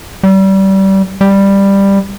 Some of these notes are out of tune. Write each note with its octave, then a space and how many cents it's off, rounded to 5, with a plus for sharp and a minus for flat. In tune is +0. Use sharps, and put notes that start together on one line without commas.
G3 -25
G3 +10